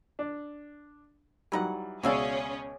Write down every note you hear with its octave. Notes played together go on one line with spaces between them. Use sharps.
D4
E3 F#3 G3 D#4 F#5
C#2 B2 C#4 F#4 G#4 D5 E5 F5